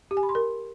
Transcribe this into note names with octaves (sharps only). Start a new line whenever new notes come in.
G4
G#5
B5
C6
A#4